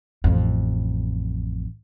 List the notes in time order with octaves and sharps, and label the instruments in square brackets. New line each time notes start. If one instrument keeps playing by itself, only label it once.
[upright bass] A1 F2